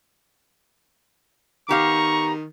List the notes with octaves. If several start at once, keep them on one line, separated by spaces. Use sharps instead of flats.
D#3 B3 G4 F5 A#5 C#6